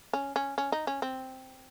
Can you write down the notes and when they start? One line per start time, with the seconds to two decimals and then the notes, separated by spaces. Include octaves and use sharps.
0.13 C#4
0.36 C#4
0.58 C#4
0.72 D#4
0.87 C#4
1.02 C4